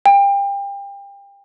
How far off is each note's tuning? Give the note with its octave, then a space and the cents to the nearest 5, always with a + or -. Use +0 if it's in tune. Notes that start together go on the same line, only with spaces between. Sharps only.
G5 +30